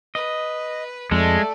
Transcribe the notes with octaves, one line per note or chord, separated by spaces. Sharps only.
B4 D#5
F2 G#3 A3 A4 D5